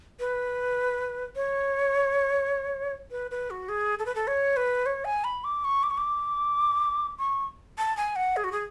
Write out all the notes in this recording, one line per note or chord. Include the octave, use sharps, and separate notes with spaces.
B4
C#5
B4
B4
F#4
G#4
A4
B4
A4
C#5
B4
C#5
G#5
B5
D6
C#6
D6
C#6
D6
C#6
A5
G#5
F#5
G#4
F#4
G#4